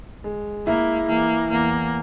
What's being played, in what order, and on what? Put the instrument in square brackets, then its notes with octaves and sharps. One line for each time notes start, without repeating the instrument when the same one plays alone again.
[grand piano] G#3
[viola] A#3 [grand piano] E4
[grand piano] E3 [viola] A#3
[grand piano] E2 [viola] A#3